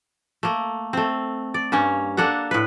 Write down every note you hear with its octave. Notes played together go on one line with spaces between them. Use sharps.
A3 A#3
A3 C4
D5
G2 A#3 C#4
A#3 D4 A4 F#5
A2 B4